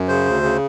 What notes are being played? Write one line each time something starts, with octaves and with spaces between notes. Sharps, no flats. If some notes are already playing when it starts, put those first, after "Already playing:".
Already playing: F#2
C#3 C5
D2
C#3